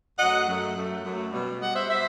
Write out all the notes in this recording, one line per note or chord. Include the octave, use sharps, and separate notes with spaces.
F#2 F#3 A3 D#5 F#5
F#2 F#3 A3
F#2 F#3 A3
F#2 F#3 A3
B2 G3
B2 G3 D#5 F#5
C5 E5
B2 G3 C5 E5